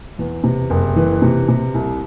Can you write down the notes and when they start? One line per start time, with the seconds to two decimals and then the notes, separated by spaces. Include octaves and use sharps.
0.19 E2
0.44 C3
0.70 F#1
0.96 E3
1.22 C3
1.48 C3
1.74 C2